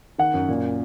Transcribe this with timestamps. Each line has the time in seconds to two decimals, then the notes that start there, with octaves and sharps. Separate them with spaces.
0.18 D#3 F#5
0.34 F#2
0.48 A#2